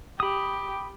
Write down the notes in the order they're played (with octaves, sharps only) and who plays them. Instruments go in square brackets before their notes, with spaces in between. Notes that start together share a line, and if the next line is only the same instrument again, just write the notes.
[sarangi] G4 [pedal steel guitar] B5 D#6